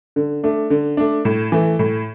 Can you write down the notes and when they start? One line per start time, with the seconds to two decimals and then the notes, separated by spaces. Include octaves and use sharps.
0.16 D3
0.43 A3 D4
0.70 D3
0.97 A3 D4
1.25 A2
1.52 E3 A3
1.79 A2